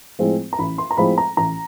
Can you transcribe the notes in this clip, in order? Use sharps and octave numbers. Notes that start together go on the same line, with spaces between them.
A2 F3 G#3 C4
A#5
A1 B5
C6
A#5
A2 F3 G#3 C4 B5
A#5
A1 A#5